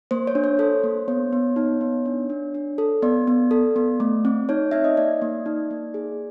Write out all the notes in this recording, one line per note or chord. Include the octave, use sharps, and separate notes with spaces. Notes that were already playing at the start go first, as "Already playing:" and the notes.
A#3 C5
C#5
D4
C#5
A4 C5
A#3
B3 C#5
B3
D#4 C#5
B3
D4
D4
D4
A4
B3 D5
B3
A4
B3
A3
C4
D#4 C#5
D#4 E5
D#5
A#3 D5
A#3
D#4
A#3
G#4